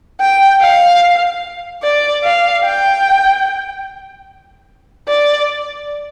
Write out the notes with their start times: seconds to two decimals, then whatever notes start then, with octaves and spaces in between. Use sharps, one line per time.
0.20 G5
0.61 F5
1.83 D5
2.23 F5
2.64 G5
5.08 D5